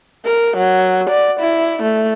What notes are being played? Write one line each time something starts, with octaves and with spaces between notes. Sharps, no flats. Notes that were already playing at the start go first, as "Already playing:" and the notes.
A#4
F#3
D5
E4
A3